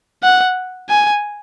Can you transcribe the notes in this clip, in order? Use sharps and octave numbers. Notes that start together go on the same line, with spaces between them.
F#5
G#5